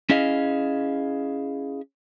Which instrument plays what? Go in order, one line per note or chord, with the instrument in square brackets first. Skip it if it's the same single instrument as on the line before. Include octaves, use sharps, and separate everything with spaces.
[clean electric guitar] C#4 E4 G#4 D#5 F5